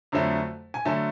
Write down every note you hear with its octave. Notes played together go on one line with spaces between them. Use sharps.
F2 D3 F#3 A3
G#5
D3 F#3 A3 A5